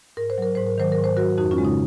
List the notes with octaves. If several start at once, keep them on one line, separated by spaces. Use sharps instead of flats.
G#2 A#4
C5
F#3 A#4
G#2 C5
A#4
D#3 F#3 C5
A#4
G#2
C5
F#3 F#4 A#4
F2 D#4 F#4
C#4 F4
C#3 G#3
D#4